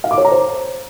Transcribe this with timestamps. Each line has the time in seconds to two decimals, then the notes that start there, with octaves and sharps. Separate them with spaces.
0.04 F5
0.11 D6
0.18 C#5
0.25 A#5
0.32 C5